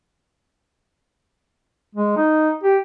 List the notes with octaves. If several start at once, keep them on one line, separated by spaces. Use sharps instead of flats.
G#3
D#4
G4